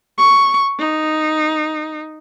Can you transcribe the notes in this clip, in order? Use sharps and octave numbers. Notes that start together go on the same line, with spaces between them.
C#6
D#4